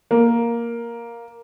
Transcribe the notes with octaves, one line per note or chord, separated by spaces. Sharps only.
A#3